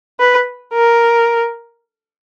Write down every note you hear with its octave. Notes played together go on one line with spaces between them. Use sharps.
B4
A#4